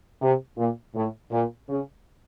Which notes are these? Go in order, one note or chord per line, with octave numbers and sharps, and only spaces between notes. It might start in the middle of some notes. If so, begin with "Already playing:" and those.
C3
A#2
A2
A#2
C#3